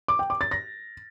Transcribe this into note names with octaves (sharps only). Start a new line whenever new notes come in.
D6
G5
D6
A6
A#6